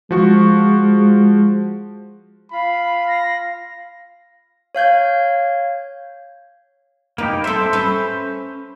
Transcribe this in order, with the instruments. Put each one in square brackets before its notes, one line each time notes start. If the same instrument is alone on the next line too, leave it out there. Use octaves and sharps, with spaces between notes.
[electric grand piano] F3 F#4 C#6 [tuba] G#3
[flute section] F4 F5 [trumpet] B5
[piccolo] A#6
[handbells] C#5 F5 G6 G#6
[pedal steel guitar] A#3 D#4 G4 [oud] B4
[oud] C4 A4 [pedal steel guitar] C5 E5 C6
[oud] C#4 B4